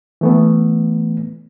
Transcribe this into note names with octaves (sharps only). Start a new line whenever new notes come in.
E3 A3 B3